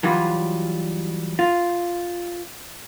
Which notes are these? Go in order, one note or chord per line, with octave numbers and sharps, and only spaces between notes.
E3 F#3 G3 F4
F4